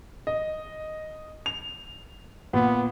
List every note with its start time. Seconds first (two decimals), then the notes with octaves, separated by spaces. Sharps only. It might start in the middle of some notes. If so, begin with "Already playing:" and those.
0.27 D#5
1.46 F7
2.54 A#2 B3